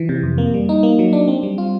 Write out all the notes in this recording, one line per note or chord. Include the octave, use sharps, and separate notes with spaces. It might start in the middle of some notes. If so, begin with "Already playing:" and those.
Already playing: E3
C3
F2
A#3
G3
D#4
A#3
F#3
D4
C4
G3
F4